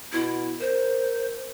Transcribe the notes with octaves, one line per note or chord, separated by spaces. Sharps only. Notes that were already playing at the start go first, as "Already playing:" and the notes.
B2 E4
A#4 C5